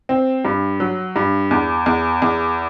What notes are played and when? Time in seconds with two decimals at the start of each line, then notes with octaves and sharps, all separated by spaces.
0.09 C4
0.45 G2
0.80 F#3
1.16 G2
1.51 E2
1.86 E2
2.22 E2